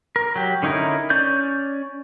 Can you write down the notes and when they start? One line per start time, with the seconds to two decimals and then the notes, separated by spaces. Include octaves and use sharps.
0.16 A#4
0.36 F#3 G4
0.63 D3 C#4 D#4 E4 A#4
1.10 C#4 D5 G6